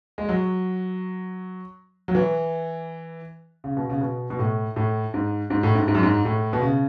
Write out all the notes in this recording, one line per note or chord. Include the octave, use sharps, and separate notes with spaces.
G#3
F#3
F#3
E3
C#3
B2
C#3
B2
B2
A2
A2
G#2
G#2
A2
G#2
G#2
F#2
G#2
A2
B2
C#3